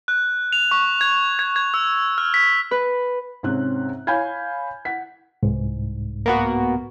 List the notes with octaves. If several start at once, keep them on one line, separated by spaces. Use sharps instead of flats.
F#6
F7
C#6
G#6
G#6
G#6
E6
F6
B6
B4
G#2 C3 C4 C#4 F#6
C#5 F5 G#5 B5 G6 G#6
F#5 B6
C2 G#2
A#3 B3 F#4